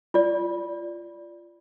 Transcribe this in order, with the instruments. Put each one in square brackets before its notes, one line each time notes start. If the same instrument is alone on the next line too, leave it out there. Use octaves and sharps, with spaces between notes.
[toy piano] F4 D5